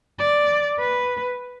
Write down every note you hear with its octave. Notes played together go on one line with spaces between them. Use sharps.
D5
B4